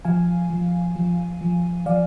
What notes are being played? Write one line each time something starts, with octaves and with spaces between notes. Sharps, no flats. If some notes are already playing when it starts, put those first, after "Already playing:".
F3 F5 G#5
F3
F3
F3
F3 D5 F5